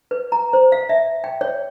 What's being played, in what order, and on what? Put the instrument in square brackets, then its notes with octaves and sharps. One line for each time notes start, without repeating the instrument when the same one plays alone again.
[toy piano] B4
A#5
C5
F5
E5
G5
C#5